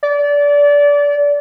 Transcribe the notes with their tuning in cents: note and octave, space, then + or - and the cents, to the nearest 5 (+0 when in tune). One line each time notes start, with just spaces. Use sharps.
D5 -25